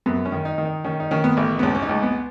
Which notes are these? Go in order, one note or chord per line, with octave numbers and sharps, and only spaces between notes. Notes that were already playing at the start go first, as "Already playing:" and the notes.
F#2 B3
C#4
D#3
D#4
D#3
D#4
D#3 C#4
D#4
D#3 C#4
B3
A1
B3
C#2 C#4
C#4
D#4
C#2
B3